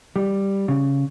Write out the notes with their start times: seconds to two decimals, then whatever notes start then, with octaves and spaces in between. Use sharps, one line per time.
0.16 G3
0.68 C#3